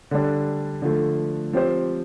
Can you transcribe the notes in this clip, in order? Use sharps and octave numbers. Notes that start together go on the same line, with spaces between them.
D3 G3 D4
D3 F3 A3
F3 C4 G4 C5